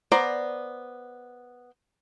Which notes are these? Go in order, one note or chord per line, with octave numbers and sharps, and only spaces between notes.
B3 C5 D5 A#5